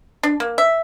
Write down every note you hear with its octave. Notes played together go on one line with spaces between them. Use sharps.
D4
A#3
E5